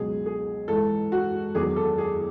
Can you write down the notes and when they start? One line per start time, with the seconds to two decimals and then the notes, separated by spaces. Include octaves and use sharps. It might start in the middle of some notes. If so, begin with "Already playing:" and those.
Already playing: C#2 B2 F#3 G#4
0.26 G#4
0.68 G#2 E3 A4
1.12 F#4
1.55 E2 D#3 F#3 G#4
1.76 A4
1.98 G#4